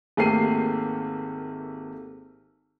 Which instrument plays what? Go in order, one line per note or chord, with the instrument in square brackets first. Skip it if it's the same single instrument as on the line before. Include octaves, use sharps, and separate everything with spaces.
[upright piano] G#1 A3 A#3 G4 C7 D#7